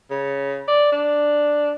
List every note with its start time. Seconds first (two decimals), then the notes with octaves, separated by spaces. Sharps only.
0.10 C#3
0.68 D5
0.92 D4